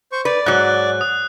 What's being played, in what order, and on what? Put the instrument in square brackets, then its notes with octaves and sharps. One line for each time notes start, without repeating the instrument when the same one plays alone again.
[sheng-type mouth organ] C5 C#6
[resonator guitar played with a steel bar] B4 [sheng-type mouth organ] D5
[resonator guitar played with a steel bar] G#2 F#3 [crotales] F#6
[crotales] D#6